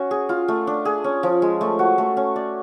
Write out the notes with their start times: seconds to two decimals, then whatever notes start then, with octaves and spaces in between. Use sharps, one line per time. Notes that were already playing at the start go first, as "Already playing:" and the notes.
Already playing: C#4 F#4
0.11 G#4
0.29 F4
0.48 A3
0.67 D4
0.85 G#4
1.04 C#4
1.23 F3
1.42 G#3
1.61 A3
1.79 F#4
1.98 A3
2.17 C#4
2.36 D5